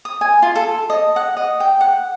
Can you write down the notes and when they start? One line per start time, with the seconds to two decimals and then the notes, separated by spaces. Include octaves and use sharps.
0.05 D#6
0.21 G#5
0.42 F4
0.55 A4
0.90 D#5
1.16 F#5
1.37 D#5
1.60 G5
1.81 F#5